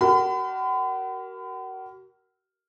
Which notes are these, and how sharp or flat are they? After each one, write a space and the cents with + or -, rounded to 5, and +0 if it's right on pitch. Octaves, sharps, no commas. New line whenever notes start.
F#4 +40 A#4 +0 B5 +40